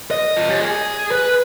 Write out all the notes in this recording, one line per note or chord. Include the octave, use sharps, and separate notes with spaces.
D#5
F4
G4
G#4
B4